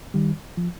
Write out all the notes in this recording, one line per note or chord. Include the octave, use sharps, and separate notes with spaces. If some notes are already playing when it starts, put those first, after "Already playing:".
D#3 G3
F3